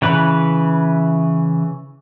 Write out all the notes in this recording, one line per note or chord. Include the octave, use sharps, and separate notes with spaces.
C#3 E3 B4